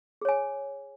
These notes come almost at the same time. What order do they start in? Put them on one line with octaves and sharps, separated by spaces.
G#4 C#5 G#5